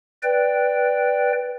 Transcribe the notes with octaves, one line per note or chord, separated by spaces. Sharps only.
B4 D5 G5